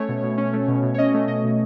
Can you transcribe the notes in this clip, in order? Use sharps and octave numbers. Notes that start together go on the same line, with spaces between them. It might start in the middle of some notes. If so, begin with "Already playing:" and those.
Already playing: A3 C#4 C#5
B2
B2
C#4
A3
B2
B2
C#5
C#4 D#5
A3
B2 D#5
B2